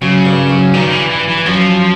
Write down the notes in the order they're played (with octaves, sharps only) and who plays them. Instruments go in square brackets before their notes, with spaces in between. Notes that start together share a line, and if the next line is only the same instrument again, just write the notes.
[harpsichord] F#2 [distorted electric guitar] C#3
[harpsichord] G2
F#2
[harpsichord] G2 [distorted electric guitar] D#3
[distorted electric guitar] E3
E3
E3
[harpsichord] F#2 [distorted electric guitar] F3